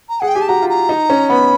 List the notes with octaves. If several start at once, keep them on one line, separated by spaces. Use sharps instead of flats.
A#5
G#4 F#5
G5
G4 G#5
A5
F#4 A#5
F4
A#5
D#4
C#4
B3 B5